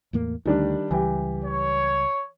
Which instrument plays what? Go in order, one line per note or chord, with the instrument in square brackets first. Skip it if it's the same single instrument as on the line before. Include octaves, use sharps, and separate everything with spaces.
[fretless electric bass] E2 A2 A#3
[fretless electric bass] D2 [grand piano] D#3 G3 D4
[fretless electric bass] C#2 G3 [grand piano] E3 G4
[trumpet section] C#5